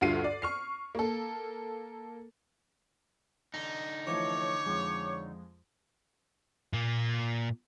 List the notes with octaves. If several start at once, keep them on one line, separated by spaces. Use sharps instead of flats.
D2 G2 F4 F#4 C7 D#7
D5
C#6 F6 C7
A#3 A4
D3 D#4
E3 F3 A3 C#5 D6
F2 F3 G#3
A#2 A#3